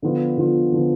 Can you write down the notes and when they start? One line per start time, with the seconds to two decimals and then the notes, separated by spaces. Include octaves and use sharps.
0.02 D3 F3 B3 F4
0.37 D3 F3 B3 F4
0.72 D3 F3 B3 F4